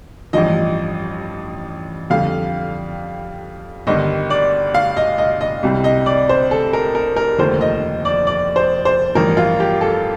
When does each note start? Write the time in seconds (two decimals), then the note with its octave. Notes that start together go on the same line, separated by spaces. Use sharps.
0.33 A1 G2 F3 D#5
2.10 F2 D3 G3 F5
3.87 G1 G2 D#3 G3 D#5
4.30 D5
4.74 F5
4.97 D#5
5.18 D#5
5.41 D#5
5.63 C2 C3 G3
5.84 D#5
6.06 D5
6.29 C5
6.51 A4
6.73 A#4
6.95 A#4
7.16 A#4
7.39 F1 D#2 D3 F3 C5
7.61 D#5
8.05 D5
8.27 D5
8.56 C5
8.85 C5
9.15 A1 G2 F3 A#4
9.37 F4
9.60 G4
9.81 A4